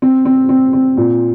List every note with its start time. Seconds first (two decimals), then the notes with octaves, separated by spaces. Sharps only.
0.02 C4
0.25 C4
0.49 C4
0.73 C4
0.97 A#2